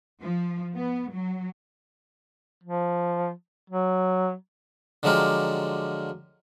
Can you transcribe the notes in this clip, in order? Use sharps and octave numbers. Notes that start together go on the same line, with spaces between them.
F3
B3
F#3
F3
F#3
D3 F3 F#3 G#3 G4 A#4